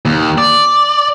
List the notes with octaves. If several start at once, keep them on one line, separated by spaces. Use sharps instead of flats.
D#2
D5